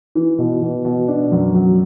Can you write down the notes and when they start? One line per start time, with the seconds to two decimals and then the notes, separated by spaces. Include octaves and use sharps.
0.15 E3
0.39 B2
0.62 B2
0.85 B2
1.08 D4
1.32 F#2
1.55 F#3